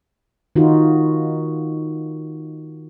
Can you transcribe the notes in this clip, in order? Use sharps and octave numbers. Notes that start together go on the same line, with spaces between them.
D#3 D#4 F4 F#4